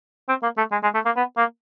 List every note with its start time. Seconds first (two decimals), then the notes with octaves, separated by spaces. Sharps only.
0.29 C4
0.43 A#3
0.58 A3
0.72 G#3
0.83 G#3
0.94 A3
1.06 A#3
1.16 B3
1.37 A#3